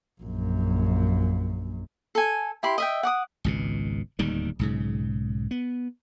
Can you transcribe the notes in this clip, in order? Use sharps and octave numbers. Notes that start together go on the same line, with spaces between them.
A#1 F#2
A4 G#5
E4 G4 B5 C6
D#5 E5 G5
F#5 D6 D#6
G#1 C#2 B2
D1 D#2 D#3 G3
B1 G#2 C#3
B3